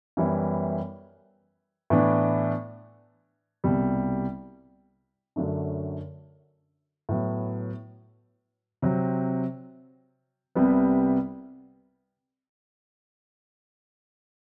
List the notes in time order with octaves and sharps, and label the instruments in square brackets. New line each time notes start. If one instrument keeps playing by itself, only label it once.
[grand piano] F#2 E3 G3 B3 E4
A2 E3 B3 D4
C2 B2 G3
F#2 D3 F#3 A3 D4
A2 F#3 B3 E4
C3 F#3 C4
C2 C3 G3 B3